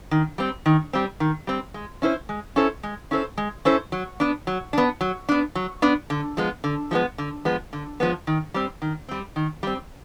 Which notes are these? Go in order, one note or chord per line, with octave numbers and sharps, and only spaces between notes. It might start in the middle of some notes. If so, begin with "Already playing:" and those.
D#3
G3 C4
D#3
G3 C4
D#3
G3 C4
G#3
C#4 E4 A4 C5
G#3
C#4 E4 A4 C5
G#3
C#4 E4 A4 C5
G#3
C#4 E4 A4 C5
F#3
B3 D4
F#3
B3 D4
F#3
B3 D4
F#3
B3 D4
D3
F3 G#3 B3
D3
F3 G#3 B3
D3
F3 G#3 B3
D3
F3 G#3 B3
D#3
G3 C4
D#3
G3 C4
D#3
G3 C4